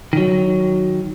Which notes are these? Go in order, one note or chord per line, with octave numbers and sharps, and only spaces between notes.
D#3 F#3